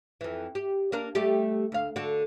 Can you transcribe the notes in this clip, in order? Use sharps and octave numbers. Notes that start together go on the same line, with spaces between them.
F2 E3
G4
A#3 D4 A#4
G3 A3 G4
D2 F5
D3 F#4 A4